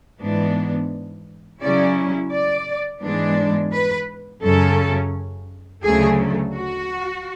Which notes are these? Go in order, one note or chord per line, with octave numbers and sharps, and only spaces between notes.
G#2 E3 B3 D4
C#3 F#3 C#4 E4 D5
D5
G#2 E3 G#3 B3 D4
B4
F#2 C#3 F#3 C#4 A4
D2 C#3 F#3 A3 G#4
F#4